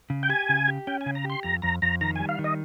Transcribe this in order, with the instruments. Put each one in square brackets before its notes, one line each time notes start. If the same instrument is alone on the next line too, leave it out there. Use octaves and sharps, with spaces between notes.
[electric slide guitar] C#3
[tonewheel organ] G5
[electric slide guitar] G4 [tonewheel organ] G#5
[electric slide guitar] C#3
G4
[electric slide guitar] C#4 [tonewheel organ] G5
[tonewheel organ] G#5
[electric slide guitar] C#3
[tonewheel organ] A#5
[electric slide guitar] G4
[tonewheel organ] C6
[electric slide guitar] F2 [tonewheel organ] A#5
[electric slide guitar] F2 [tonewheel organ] A#5
[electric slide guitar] F2 [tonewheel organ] A#5
[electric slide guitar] D#3 [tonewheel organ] A#5
[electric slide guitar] G3 [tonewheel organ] G#5
[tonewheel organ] F5
[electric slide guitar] D#3
[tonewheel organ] D#5